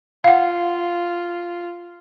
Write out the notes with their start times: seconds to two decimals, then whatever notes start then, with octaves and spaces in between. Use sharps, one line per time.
0.24 F4 F5 F#5